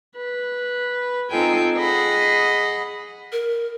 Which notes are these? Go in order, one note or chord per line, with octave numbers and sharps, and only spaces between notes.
B4
C4 D#4 F4 A4 G5 G#5
G#4 D#5 F#5 B5
A#4